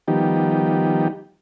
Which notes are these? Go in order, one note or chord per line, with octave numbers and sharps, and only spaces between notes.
D#3 F3 G3 B3 D#4 G4